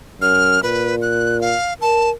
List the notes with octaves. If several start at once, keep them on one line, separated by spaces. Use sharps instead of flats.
F#2 F6
A#2 B4
F#6
F5
A#4 A5